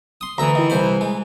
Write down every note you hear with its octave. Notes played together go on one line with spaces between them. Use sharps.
C6 D#6
D2 E3 E5 A#5 D#6
D#3 E4 D#5
C2 C5 B5
G#3